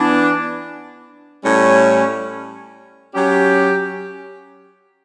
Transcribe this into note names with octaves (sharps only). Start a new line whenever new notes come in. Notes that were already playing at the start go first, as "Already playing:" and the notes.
Already playing: E3 B3 D4
A2 G3 C#4
F#3 C#4 G4